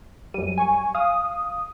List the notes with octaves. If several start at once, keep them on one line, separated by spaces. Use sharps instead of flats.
F#2 G3 D#7
G#5 C#6
F5 D#6